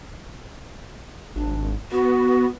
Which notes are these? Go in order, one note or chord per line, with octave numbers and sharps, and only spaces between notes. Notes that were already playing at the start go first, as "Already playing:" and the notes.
G#1 D4
B3 F#4